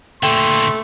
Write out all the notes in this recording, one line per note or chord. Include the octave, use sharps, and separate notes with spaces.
A#2 D3 A3 G5 C6